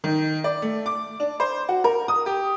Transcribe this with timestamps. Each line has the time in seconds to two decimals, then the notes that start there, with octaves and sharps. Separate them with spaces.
0.04 D#3
0.44 D5
0.62 A3
0.86 D6
1.20 D4
1.40 C5
1.69 F#4
1.84 A#4
2.08 D#6
2.26 G4